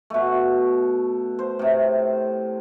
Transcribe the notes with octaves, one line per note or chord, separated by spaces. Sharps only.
B2 A3
C5
A2 C3